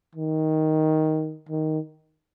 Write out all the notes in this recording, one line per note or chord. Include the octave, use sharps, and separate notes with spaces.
D#3
D#3